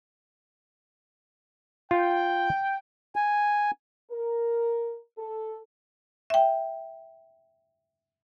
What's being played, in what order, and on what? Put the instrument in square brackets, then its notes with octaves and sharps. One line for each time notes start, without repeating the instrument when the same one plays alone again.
[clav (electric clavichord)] F4 [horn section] G5
[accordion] G#5
[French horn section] A#4
A4
[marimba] E5 G5